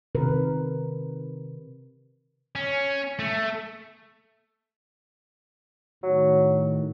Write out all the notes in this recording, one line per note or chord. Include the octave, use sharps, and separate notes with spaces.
C3 D#3 A#4 B4
C#4
A3
A2 D#3 F#3